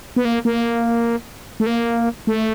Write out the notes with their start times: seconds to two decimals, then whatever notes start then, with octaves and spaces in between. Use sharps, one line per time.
0.16 B3
0.25 A#3
0.45 A#3
1.60 A3
1.66 A#3
2.27 A3